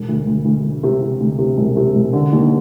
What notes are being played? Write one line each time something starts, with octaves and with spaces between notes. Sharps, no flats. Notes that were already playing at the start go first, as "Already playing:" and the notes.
Already playing: E1
D2
D2
D2
E1
C3
C3
D2
C3
E1
C3
E1
D3
D#2